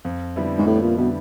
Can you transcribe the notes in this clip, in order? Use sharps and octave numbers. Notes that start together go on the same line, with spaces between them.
F2
D3 G3 B3 E4
G#2
F2 A2
A#2
B2 D3 G3 B3 E4